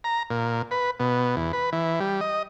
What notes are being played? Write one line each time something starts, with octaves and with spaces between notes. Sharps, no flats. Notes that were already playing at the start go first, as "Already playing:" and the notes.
A#5
A#2
B4
B2
E2
B4
E3
G3
D#5